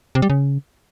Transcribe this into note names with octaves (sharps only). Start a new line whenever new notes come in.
C3
G3
C#3